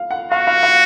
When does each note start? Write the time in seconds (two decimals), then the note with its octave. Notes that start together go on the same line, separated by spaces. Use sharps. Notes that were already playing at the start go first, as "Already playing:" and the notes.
Already playing: F5
0.11 F#5
0.32 F#4 F5
0.47 F5
0.63 F5